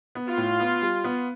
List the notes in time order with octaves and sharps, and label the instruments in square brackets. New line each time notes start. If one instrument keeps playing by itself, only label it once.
[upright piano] B3
[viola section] F4
[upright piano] A2
B3
G3
B3